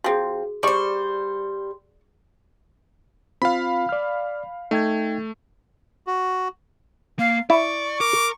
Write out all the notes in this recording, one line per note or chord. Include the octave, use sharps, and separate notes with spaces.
F3 C4 F#4 G#4
G3 C5 D5 C#6
C4 F4 F5 B5
D5 F6
A3 D#4 G5 G#6
F#4
A#3 F5
E4 D5 C#6
A#4 D6